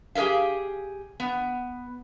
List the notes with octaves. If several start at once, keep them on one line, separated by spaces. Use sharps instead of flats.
G4 G#4 A#4 E5 F5
B3